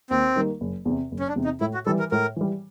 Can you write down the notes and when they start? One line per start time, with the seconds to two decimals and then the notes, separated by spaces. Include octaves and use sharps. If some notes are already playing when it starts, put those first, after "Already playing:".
0.10 D#2 C4
0.36 D#3 G3 A#3
0.61 F#1
0.85 E2 C3
1.12 F#1
1.20 C#4
1.28 D4
1.36 E2 C3
1.45 D#4
1.61 A2 E4
1.74 F#4
1.86 E3 G3 A4
1.99 A#4
2.11 A2 A#4
2.36 E3 G3